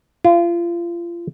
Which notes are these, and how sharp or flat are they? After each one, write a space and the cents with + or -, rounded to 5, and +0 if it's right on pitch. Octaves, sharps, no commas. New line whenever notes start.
F4 -30